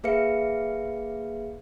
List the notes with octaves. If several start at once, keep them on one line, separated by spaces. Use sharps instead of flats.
A#3 G#4 B4 E5 F5 C#7